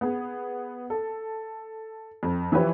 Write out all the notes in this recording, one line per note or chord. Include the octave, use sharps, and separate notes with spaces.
B3 G#4
A4
F2
E3 F3 E4 G4 B4 C#5